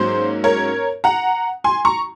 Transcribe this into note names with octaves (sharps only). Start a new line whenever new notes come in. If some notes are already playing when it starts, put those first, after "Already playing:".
Already playing: G#2 F#3 A#3 C#4 C5
A#4 C#5
F#5 A#5
G#5 C6
A#5 C#6